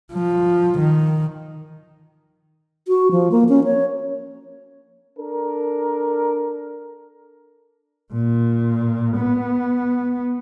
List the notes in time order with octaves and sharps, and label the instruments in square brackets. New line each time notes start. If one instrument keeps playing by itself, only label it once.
[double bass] F3
D#3
[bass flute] F#4
F3
A#3
C#4
C#5
[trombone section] D4 A4 A#4
[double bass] A#2
B3